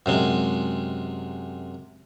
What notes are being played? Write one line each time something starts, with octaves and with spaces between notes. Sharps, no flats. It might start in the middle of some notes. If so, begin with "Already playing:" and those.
F#2 C3 G#3